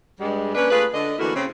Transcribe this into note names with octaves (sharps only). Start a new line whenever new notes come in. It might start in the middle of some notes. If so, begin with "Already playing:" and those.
G2 G3 G#3
A#3 C#4 D4 B4
A3 F4 G#4 B4
D3 D#5
D3 E3 A3 A#3 E4 F#4
C#3 C4